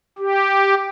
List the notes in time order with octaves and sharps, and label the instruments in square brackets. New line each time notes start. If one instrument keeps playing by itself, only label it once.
[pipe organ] G4